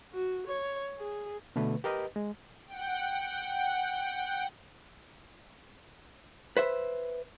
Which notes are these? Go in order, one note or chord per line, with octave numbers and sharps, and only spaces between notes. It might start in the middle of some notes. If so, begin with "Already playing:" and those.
F#4
C#5
G#4
B2 D3 A3 B4
G4 A#4 B4 D#5
G#3
F#5 G5
B4 C5 E5